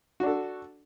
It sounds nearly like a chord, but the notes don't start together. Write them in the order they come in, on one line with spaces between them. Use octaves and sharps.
F#4 D4 A4